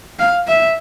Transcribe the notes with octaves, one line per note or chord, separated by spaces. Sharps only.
F5
E5